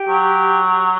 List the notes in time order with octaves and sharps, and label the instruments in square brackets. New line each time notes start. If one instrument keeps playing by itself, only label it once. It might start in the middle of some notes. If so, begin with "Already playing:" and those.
Already playing: [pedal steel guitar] G4
[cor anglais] F#3